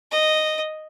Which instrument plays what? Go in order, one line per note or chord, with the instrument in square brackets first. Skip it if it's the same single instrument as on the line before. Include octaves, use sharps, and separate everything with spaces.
[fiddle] D#5